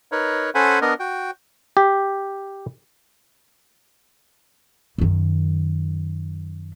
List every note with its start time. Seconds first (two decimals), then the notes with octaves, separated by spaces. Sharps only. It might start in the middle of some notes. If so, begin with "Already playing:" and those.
0.12 D#4 A#4 B4 C#5
0.55 C#4 A4 C5 F#5 G#5 B5
0.81 B3 D4 A#4 D#5
1.00 F#4 G5
1.77 G4
4.98 F#2 D#3